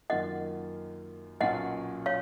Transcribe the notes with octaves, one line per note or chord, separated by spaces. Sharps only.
F#2 D#3 A#3 F4 D#5 F#5
B1 A#2 F#3 C#4 F4 D#5 F#5
C#5 F5